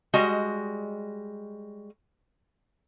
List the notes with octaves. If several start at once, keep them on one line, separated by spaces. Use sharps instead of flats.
G3 G#3 F#4 D#5